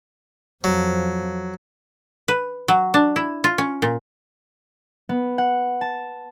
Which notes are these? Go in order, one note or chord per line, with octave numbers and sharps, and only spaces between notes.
F2 F3 F#3
B4
F#3
D4
E4
F4
C#4
A#2
B3
F#5
A5